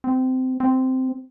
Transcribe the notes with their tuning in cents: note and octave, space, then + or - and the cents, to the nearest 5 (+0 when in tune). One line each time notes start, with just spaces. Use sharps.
C4 -20
C4 -10